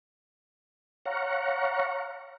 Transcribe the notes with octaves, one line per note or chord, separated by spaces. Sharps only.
C#5 F5 F#5 A#5 C#6